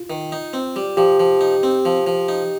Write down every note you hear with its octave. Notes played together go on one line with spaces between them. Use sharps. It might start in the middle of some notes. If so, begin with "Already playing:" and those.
Already playing: F4
D#3
D#4
C4
G3
F3 G4
F3
D#4
C4
F3
F3
D#4